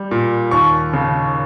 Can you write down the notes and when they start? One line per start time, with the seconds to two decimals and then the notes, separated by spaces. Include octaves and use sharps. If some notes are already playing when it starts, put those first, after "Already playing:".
Already playing: G3
0.11 A#2
0.51 D#2 C#6
0.93 C#3